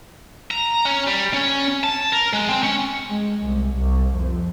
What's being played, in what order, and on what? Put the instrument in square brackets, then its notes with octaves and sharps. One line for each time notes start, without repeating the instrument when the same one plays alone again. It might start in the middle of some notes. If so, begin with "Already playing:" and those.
[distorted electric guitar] A#5
C#4
G3
C#4
A5
A#4
G#3
C4
C#4
[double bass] G#3
C2
C2
F2